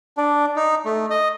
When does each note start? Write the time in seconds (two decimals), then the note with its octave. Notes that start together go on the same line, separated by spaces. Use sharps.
0.17 D4
0.56 D#4
0.85 A3
1.10 D#5